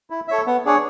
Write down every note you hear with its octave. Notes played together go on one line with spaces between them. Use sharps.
E4
A4 C#5 E5
B3
D4 G#4 C#5